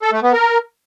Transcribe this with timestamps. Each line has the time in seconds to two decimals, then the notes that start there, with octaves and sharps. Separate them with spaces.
0.02 A4
0.13 A3
0.23 B3
0.33 A#4